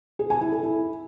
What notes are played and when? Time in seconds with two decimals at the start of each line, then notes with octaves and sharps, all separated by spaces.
0.19 G#4
0.30 G#5
0.41 E4
0.52 A4
0.63 E4